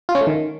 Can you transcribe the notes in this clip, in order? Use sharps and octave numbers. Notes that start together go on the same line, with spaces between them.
F4
C#4
A3
D#3